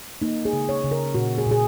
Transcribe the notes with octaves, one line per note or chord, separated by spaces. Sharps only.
A#3 D#4
G#4
C#3
C#5
C#3
A#4
A#2 F#4
G#4
A#2
G#4